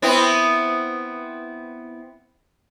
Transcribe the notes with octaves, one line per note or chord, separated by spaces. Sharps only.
B3 C4 E4